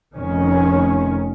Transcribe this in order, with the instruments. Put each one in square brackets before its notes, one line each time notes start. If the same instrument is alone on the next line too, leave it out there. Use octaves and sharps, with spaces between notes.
[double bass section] F1 D#3 C#4